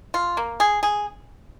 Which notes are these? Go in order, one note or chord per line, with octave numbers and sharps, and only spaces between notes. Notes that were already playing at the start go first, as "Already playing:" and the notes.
F4
A#3
G#4
G#4